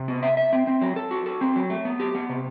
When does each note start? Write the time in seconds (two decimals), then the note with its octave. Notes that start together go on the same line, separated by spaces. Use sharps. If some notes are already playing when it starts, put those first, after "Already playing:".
Already playing: C3
0.08 B3
0.22 E5
0.37 E5
0.53 C4
0.67 C4
0.82 F#3
0.96 A4
1.11 F#4
1.26 A4
1.41 C4
1.56 F#3
1.70 A3
1.85 B3
2.00 G4
2.15 B3
2.29 C3